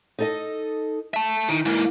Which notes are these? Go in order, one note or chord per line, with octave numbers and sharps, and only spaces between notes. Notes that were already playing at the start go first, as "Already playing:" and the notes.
D#4 A4 D#5
E5 A5
D#3 E3
G#2 A#3